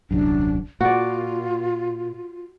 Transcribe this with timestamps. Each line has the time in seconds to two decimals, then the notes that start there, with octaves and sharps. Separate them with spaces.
0.11 D#1 C2 F#2 D4
0.81 A#2 F4 F#4 D5